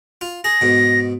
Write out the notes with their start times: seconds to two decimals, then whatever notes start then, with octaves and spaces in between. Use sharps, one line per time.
0.21 F4
0.44 G#4 A#6
0.61 G#2 B2